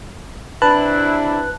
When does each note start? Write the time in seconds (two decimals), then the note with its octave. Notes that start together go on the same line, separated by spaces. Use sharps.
0.62 C3 D4 E4 B4 A5 F#6